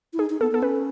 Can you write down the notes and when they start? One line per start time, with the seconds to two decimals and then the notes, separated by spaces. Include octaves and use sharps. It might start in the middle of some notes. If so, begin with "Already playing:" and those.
0.13 E4
0.19 D#4 G#4
0.30 D#4
0.41 B3 A4
0.51 B3 A4
0.62 C#4 B4